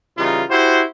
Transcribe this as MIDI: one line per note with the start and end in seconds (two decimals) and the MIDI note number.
0.17 0.43 49
0.17 0.43 52
0.17 0.43 55
0.17 0.43 63
0.17 0.43 65
0.49 0.82 64
0.49 0.82 66
0.49 0.82 67
0.49 0.82 72